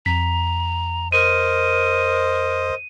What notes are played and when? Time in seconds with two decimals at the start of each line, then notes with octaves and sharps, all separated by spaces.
0.06 F2 A#5 B6
1.12 A#4 C5 D#5 D#7